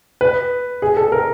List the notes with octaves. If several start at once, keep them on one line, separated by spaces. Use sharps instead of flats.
B4
G#4
A4
A#4